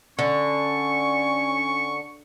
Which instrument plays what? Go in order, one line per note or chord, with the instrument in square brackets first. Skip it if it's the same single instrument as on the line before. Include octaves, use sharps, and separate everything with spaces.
[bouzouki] D3 [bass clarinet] C#4 [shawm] C#6